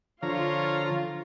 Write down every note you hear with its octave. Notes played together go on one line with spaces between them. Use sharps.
D3 F3 F4 C#5 F5 A#5